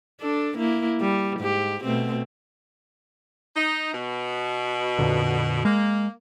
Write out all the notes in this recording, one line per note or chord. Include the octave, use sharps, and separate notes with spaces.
D4 A4
A#3 E4
G3
G#2 G4
B2 A3 C4
D#4
B2
F2 A#2 D3
G#3 A#3